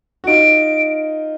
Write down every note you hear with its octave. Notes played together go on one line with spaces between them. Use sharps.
F#4
D#4 F4 D7